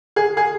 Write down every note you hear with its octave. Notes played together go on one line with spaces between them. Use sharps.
G#4
G#4